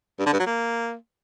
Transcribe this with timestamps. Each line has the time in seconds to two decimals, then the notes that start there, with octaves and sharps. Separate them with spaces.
0.19 G2
0.26 D3
0.33 G2
0.40 F#3
0.46 A#3